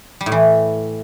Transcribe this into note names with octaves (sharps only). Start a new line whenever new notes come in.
G3
A2
E3